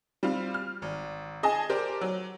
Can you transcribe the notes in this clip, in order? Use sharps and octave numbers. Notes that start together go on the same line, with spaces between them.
G3 C4 F4
F6
G#1
G#4 D#5 G#5 A5
G4 A#4 C5 D5
F#3